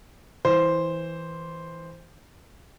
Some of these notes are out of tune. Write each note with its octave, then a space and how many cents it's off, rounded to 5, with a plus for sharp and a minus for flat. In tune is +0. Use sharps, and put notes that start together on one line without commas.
E3 -10 C5 +0